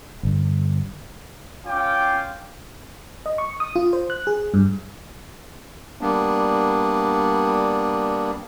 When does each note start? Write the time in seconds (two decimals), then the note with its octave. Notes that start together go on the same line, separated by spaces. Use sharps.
0.23 G1
1.66 C#4 F4 F5 G5 D6
3.26 D#5
3.38 C#6
3.60 D#6
3.76 F4
3.93 C5
4.10 F#6
4.27 G#4
4.54 G2
6.01 G3 A#3 B3 D4